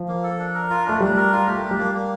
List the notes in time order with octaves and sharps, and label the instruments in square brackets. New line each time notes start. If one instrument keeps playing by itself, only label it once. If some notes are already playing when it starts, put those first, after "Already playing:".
Already playing: [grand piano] F3
[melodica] A#3
A4
D4
A#4
F4
[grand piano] A3 [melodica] D4
[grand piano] G3 [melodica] D4
[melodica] A#4
F4
[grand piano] A3 [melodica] G4
[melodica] D4
[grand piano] G3
[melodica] A#3
A#3